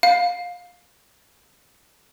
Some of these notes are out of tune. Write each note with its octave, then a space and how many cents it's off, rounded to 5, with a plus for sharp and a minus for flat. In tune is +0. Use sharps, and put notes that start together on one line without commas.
F5 +25